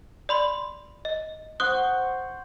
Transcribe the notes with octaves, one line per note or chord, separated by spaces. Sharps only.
D5 B5 C6
D#5
C5 F#5 C#6 D#6 F#6 G7